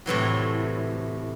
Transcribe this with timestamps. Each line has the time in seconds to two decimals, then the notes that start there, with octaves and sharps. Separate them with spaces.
0.06 A2 C3 E3 F#3